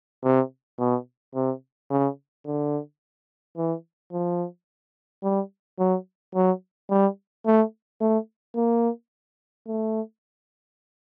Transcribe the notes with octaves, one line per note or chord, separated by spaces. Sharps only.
C3
B2
C3
C#3
D3
E3
F3
G3
F#3
F#3
G3
A3
A3
A#3
A3